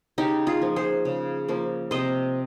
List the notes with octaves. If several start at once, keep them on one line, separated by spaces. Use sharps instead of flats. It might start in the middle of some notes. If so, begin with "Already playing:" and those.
C#3 D#4 G4
F4 G#4
F3 A#3
G#4 C5
C#3
F3 A#3
C3 C5 D#5